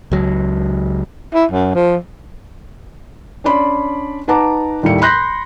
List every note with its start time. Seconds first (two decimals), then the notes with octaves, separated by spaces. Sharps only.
0.12 C#2 F#3
1.34 E4
1.52 F#2
1.75 F3
3.44 C#4 D4 D5 B5 C6
4.28 D#4 B4 F#5 A5 A#5 D6
4.83 D#2 A2 G3 A3 C#7
5.01 B5 C6 F#6 G6 A#6 B6